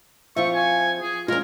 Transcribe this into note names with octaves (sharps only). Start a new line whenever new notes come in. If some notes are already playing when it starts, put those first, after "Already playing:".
F3 C4 F4 E5 C#6
G#5
G#4
G#3 C#4 F4 A#4